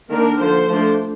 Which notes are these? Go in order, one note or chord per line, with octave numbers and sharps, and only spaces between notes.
D#3 A#3 D4 A#4
D3 F3 A#3 C5
F3 A3 D4